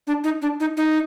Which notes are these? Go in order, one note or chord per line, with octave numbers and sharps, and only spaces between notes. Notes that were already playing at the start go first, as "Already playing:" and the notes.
D4
D#4
D4
D#4
D#4